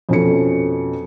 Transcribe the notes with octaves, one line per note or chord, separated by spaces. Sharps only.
F2 B2 C#4 A4 C#7